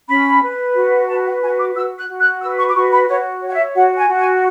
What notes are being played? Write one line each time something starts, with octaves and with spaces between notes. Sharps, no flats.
C#4 B5
B4
F#4
B4 A5
F#5
F#4 G#5
D6
F#4 E6
F#6
F#4
F#6
B4 E6
C#6
D6
F#4 C#6
B5
F#4 C#5
C#5
F#5
E5
F#4 F#5
G#5
F#4
G#5